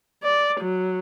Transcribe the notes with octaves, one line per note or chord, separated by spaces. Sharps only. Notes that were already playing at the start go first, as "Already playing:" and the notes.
D5
F#3